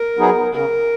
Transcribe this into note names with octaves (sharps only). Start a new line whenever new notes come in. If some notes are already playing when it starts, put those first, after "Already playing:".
Already playing: A#4
F#3 B3 D#4 G#4
C#3 A#4